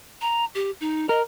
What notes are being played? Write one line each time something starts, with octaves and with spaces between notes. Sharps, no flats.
A#5
G4
D#4
A#4 D#5